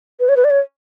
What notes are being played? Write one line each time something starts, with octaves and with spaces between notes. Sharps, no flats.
B4
C#5
B4
D5
C#5